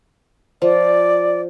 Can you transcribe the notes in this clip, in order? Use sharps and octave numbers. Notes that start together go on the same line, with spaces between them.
F3 D5